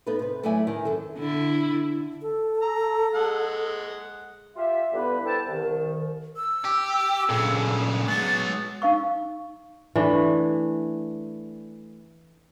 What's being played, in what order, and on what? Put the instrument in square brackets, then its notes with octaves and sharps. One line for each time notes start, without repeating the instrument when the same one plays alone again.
[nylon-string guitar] B3 D#4 A4 B4
C3 B4
F#3 A3 E4 D5 E5 G#5
D#3
F#2 E3 A4
[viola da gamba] D3 E4
[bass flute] A4
[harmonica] A#5
G#3 F#5
[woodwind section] F4 G4 E5
G2 D3 G3 B3 E4 B4
A4 B4 C5 G5 A5
C2 D#3
[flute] E6
[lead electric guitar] G4
[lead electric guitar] G2 C#3 [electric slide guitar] A#2 G#4 A4
[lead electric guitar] F#3 B3 [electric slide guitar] G#3 [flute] A6
[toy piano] D#4 F5 C#6
[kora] E3 A3 D4